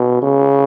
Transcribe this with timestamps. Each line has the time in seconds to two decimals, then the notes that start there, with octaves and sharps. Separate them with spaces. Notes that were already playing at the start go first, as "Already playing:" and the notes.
Already playing: B2
0.23 C#3